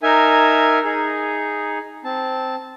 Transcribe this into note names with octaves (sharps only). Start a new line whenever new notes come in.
D#4 A#4 E5 G#5
D#4 G#4
C4 A5